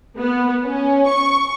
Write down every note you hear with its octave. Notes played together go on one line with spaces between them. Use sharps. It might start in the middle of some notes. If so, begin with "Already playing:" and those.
B3
C#4
C#6